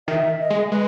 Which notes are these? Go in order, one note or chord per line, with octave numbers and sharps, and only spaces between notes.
D#3 E5
D#5
G#3
G#3 B4